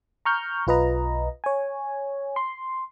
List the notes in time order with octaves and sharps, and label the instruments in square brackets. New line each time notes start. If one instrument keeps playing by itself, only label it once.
[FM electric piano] A#5 C#6 F6 G6
B1 F4 B4 D#5 A#5
C#5 G#5
C6